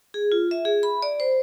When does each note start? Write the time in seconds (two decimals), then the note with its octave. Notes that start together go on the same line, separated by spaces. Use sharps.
0.14 G#4
0.32 F4
0.51 E5
0.65 G#4
0.83 B5
1.02 D5
1.20 C5